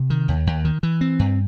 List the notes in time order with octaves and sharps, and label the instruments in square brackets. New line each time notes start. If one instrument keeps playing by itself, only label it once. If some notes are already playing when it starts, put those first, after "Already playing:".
Already playing: [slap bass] C3
D#3
D#2
D#2
D#3
E3
C4
G2